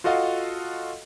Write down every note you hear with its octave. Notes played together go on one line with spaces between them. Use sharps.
F4 F#4 A4 D#5 F5 F#5